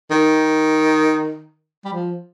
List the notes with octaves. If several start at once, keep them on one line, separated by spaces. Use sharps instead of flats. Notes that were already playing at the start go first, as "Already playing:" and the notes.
D#3
G3
F3